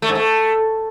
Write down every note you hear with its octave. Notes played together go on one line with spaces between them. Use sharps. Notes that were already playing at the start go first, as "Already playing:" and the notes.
A3
G#2
A3